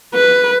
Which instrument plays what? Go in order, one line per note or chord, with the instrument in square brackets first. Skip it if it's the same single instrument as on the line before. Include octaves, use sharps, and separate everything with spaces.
[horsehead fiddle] B4